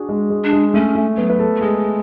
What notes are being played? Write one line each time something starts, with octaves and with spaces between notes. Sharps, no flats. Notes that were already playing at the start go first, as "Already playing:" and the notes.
Already playing: D4 F#4 G#4
G#3
G#3
D4
G#3
A3 C#4
A3
F#3 B3
B4
A4
A3
G#3 G#4